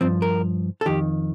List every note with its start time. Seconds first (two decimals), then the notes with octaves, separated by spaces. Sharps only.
0.01 G2 F3 C4
0.22 A#4
0.81 A4
0.86 F2 D#3 G4